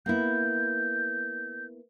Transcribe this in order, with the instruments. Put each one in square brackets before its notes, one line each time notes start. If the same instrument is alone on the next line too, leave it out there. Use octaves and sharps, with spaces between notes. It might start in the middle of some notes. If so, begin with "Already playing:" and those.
[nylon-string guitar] A#3 B3 E4 [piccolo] G6